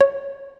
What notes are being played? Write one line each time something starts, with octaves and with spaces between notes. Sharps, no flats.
C#5